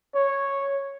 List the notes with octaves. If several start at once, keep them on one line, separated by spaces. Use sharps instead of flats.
C#5